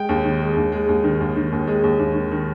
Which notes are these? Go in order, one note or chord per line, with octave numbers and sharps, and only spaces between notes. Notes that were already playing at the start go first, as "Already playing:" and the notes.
Already playing: G#3 G5
D#2
D#3
G#3
D#2
G#3
D#2
D#3
D#2
D#3
D#2
G#3
D#2
D#2
D#3
D#3